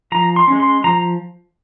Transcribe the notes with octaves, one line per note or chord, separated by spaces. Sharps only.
F3 A#5
C6
G#3 C#4
C6
F3 A#5